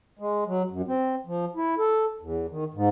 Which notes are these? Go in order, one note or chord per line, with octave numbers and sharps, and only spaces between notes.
G#3
F#3
F#2
C4
F3
E4
A4
E2
D#3
G#2